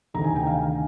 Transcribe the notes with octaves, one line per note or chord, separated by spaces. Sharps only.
D2 C3 D#3 A#5
G#5
G5
F5 G#5